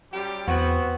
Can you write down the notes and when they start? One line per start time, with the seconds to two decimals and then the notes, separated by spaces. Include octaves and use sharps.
0.12 F#2 G3 G4
0.48 E2 B3 C4 F#4